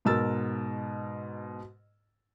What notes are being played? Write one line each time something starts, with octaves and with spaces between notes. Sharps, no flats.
G#2 B2 A#4 E6 A6